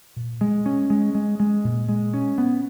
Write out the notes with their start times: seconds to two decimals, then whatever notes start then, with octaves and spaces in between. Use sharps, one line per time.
0.16 A#2
0.41 G#3
0.66 C#4
0.90 G#3
1.15 G#3
1.40 G#3
1.64 A#2
1.89 G#3
2.14 C#4
2.38 B3